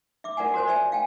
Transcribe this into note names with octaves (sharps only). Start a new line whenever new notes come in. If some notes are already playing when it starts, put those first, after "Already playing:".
E5 D6
F4 A#4 D5 F#5 G#5
F#4 A#4 C5 C#5 G#5
D5 E5 G#5
F5 G5 G#5